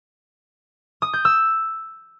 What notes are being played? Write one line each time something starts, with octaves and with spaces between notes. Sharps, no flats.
D#6
G6
E6